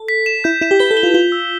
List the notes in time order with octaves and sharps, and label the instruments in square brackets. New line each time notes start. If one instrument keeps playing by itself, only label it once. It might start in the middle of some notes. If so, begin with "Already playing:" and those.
Already playing: [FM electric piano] A4
[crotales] B6
E7
[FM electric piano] E4 [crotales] G6
[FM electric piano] E4 [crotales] E7
[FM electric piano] G4
[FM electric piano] B4 [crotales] G7
[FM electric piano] A4
[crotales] G7
[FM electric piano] F4
[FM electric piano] F4 [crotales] G7
[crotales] E6